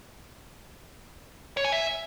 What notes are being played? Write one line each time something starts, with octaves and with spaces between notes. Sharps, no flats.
C#5
G#5
E5